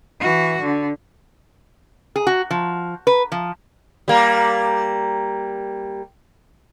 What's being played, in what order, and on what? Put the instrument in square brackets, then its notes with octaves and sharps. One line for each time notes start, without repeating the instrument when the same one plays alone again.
[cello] E3 F#4
D3
[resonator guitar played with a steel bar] G#4
F#4
F3
B4
F3
[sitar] G3 A#3